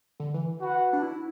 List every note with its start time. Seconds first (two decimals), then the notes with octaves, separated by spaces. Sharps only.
0.20 D3
0.34 E3
0.61 F#4 B4 F#5
0.93 D4
1.02 E4